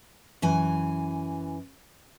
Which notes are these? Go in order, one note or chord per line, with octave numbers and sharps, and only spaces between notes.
F#2 E3 G#5